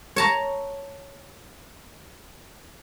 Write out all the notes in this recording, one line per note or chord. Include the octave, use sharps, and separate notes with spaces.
C#5 A5 A#5